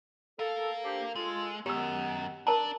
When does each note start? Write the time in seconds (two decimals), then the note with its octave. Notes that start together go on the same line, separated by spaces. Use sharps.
0.39 A4 A#4 F5
0.83 D4 G4 C5
1.15 G#3 F4 A4
1.66 F#2 D#3 G#3 B3 G4 E6
2.47 D4 A#4 D5 A5 A#5